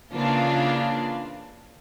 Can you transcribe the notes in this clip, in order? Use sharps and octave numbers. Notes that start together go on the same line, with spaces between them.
C#3 E3 A#3 D4 F4